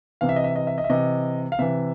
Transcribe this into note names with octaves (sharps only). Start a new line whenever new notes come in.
C3 E3 F5
E5
D#5
E5
D#5
E5
D#5
E5
C3 E3 D#5
F5
C3 E3 E5